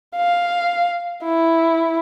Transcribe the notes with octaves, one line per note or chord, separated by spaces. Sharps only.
F5
E4